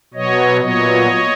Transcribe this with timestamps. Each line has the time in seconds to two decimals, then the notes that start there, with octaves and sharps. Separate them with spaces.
0.14 B2 F#3 B3 C#5 D#5
0.61 A#2 F#3 B3 C#5 D#5